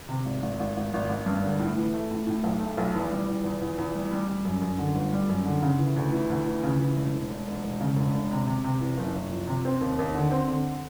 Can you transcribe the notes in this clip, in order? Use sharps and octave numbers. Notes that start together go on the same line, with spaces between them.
C3
G#1
G#1
G#1
G#1
G#1
G#1
G2
D3
A2
E3
A3
A2
A2
B1
A3
B1
E2
G3
E2
E2
E2
E2
G3
G3
G3
F#2
F#2
D3
G1
G3
F#2
D3
C#3
E3
D2
E3
D2
E3
C#3
E3
E1
E1
E1
E1
E1
C#3
E1
E1
C3
C3
C3
E2
F#1
F#1
F3
C3
C4
D#2
D#2
D3
C4
D3